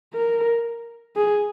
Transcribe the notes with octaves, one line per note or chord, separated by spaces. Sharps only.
A#4
G#4